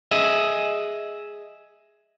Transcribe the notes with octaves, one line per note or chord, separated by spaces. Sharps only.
G#4 D#5 E5